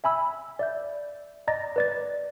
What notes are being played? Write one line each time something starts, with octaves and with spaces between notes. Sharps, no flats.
E5 G#5 B5 E6
D5 E5 G6
D5 D#5 A#5 A6 A#6
B4 D5 A6